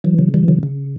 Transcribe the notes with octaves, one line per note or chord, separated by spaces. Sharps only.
E3 F#3
C#3 F#3
E3 G3
C#3 F#3
C#3